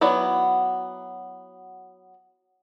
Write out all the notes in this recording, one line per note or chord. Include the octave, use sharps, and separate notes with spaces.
F#3 B3 E4 D5